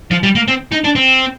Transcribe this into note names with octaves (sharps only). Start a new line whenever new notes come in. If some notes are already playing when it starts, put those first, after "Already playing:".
F3
G3
A#3
C4
D#4
D4
C4